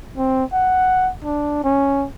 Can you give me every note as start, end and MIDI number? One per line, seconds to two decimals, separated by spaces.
0.17 0.44 60
0.53 1.11 78
1.24 1.61 62
1.64 2.06 61